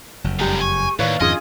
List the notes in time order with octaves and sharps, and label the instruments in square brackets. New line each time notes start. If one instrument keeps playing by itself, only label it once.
[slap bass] F#1 F2
[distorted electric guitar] A2 G3 [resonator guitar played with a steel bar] G#3 G4 [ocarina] A#5
[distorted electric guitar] G#5 [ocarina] C#6
[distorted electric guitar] D#2 [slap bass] A2 D#3 [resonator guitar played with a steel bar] B4 C#5 D5 [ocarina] F5
[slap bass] F2 G#2 D#3 [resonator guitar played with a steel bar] C#4 F4 G#4 [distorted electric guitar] D#5